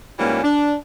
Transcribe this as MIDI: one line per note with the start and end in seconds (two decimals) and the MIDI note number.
0.19 0.43 44
0.19 0.43 52
0.19 0.43 53
0.19 0.43 55
0.19 0.43 58
0.19 0.43 61
0.43 0.75 62